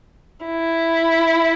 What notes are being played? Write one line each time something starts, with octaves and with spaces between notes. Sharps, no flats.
E4